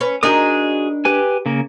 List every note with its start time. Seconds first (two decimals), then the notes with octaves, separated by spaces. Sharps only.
0.01 C#4 B4
0.23 D4 D#4 F#4 G#4 A#4 D#6
1.05 G4 B4 G#5
1.46 C#3 A#3 A#4